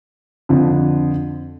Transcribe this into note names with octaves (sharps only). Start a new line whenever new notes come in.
F2 D3 F3